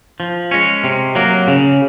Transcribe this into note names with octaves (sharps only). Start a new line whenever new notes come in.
F3
G#3 C#4
C3
F#3 A#3
C#3